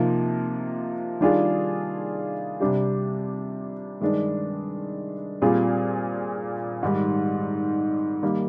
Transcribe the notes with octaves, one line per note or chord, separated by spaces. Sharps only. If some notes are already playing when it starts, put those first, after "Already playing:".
Already playing: C3 F3 A#3 D#4
D#3 G3 D4 F4 G#4
C3 G3 D4 G4
G2 D#3 G#3 D4
A#2 G3 C4 F4 G#4
G#2 D#3 G3
D#3 G3 A#3